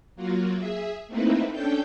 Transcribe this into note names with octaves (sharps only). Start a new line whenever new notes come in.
F#3 A#3 F4 F#4
G#4 E5
A3 A#3 C4 D#4 E4 B4
C#4 D4 A4 G5 G6